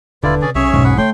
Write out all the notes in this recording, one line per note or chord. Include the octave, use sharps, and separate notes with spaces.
D#1 D3 E4 F4 B4 D5
C3 C#4 G#4 D5
B1 C#4 G#4 C#5 E5
B1 F2 G#2 B2
G#4 F#5 B5
D3 A3 D#4 C#5 G5 C6